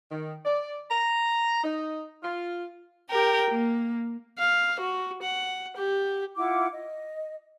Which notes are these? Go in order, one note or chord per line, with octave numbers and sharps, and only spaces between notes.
D#3
D5
A#5
D#4
F4
G4 A#4 G5
A#3
F5
F#4
F#5
G4
E4 F4 F#5 D6
D#5